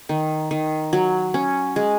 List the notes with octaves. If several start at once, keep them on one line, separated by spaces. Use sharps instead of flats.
D#3
D#3
F#3
C#4
G#3